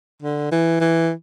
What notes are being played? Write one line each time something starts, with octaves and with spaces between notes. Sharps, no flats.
D3
E3
E3